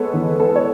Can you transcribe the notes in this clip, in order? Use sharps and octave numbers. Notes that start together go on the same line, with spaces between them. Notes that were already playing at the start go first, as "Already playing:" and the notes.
Already playing: G#3 B3 A4 C#5
E2
B3 A4
C#5